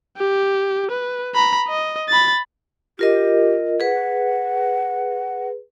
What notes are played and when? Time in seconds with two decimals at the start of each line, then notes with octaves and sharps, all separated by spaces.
0.17 G4
0.91 B4
1.35 A#5 B5
1.68 D#5
2.09 B5 A6
2.99 F4 G4 A#4 D#5
3.80 G#4 B4 F#5